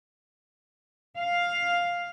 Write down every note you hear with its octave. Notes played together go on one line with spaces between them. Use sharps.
F5